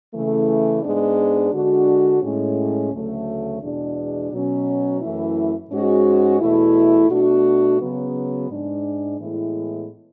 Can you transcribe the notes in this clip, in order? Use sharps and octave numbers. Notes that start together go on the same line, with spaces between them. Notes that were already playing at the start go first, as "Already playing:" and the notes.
C#3 E3 A3
G#2 G#3 B3 D4
D3 G#3 D4 F#4
A2 G#3 C#4
D2 C#3 F#3 A3
E2 B2 G#3 D4
B2 F#3 C#4
F#2 E3 A3 E4
G#2 G#3 C#4 F#4
E2 B2 A3 E4
B2 A3 D4 F#4
C#3 F#3 B3
G#2 G#3 D4
A2 E3 G#3 B3 E4